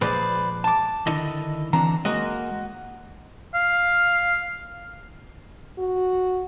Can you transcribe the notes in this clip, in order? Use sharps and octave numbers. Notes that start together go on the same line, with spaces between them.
A#2 F3 G#3 B4 C5 D5
A5 D6
D3 D#3 E4 D#5
D3 E3 C4 D4 A#5
G#3 A#3 F#4 D#5
F5
F#4